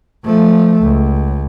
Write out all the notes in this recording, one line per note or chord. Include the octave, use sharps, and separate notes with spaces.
F3 A3
C#2